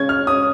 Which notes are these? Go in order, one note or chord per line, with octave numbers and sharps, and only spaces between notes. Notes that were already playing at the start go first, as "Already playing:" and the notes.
Already playing: C#3 C#4 G#6
F6
C#4 D#6